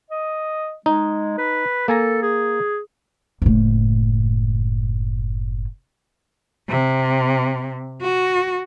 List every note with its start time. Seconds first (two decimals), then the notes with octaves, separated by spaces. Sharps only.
0.11 D#5
0.86 G#3 D#4
1.38 B4
1.88 A#3 A4 G#5 A#5
2.22 G#4
3.42 F#1 A2
6.69 C3
8.02 F#4